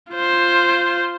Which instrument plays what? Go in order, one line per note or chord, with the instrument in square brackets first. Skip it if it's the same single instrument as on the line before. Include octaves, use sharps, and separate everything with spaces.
[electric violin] F4 C5